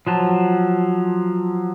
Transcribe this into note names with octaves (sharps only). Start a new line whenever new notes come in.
F3 F#3 A5